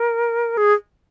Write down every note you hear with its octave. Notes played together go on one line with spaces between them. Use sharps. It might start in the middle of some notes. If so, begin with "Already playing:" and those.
Already playing: A#4
G#4